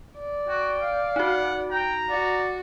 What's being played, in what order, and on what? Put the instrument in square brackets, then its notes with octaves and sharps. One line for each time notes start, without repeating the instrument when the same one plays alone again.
[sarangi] D5
[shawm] F#4 [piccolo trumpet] G5
[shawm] F5
[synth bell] D#4 F#4 [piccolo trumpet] F#5
[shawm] G5 [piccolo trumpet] A#5
[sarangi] F#4 [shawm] D5